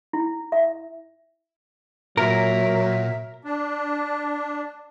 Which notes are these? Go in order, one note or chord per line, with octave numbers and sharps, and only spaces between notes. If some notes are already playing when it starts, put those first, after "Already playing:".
E4
E5
A#2 F#3 A#4 E5
D4